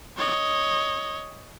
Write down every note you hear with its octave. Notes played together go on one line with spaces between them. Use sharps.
C#5 D#5